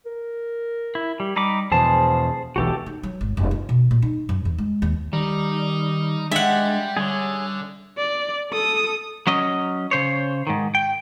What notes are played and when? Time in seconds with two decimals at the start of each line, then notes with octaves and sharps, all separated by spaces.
0.06 A#4
0.95 E4
1.20 G3
1.36 G3 D#4 B5 D6
1.72 E2 B2 F3 G#4 C5 A5
2.56 E1 B1 E3 F#4 G4 A4
2.86 D#4
3.03 F#3
3.21 G#1
3.37 F1
3.51 F4
3.69 B2
3.91 A#2
4.02 D#4
4.29 F#2
4.45 E2
4.58 G#3
4.82 D#2
5.13 D#3 G3 D#4
6.31 G3 G#3 D4 E5 F#5
6.97 D3 G3 G#4 C#5
7.98 D5
8.51 A4 D#6
9.27 F#3 C#4 D#5
9.91 C#3 C5 C#5
10.47 G#2 D#3
10.75 G5